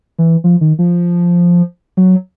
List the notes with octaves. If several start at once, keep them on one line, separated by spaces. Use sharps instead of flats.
E3
F3
D#3
F3
F#3